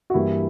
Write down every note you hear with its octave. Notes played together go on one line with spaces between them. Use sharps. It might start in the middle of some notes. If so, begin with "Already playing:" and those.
F#4
G2 E3 G3 A#3 E4